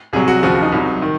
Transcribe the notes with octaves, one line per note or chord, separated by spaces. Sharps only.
C2 C3 F#3 G#4
F#4
D#2 C#3 F3 F#4
D#4
C2 C3 F#3
D#3